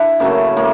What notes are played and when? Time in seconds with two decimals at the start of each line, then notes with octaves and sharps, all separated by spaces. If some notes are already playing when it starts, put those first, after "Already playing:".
Already playing: D4 E4
0.20 C#3 F#3 A3 A#3
0.57 A2 A#3